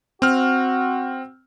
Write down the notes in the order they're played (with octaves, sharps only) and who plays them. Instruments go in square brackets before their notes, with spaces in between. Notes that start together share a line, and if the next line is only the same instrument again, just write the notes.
[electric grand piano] C4 F6 [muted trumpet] F#4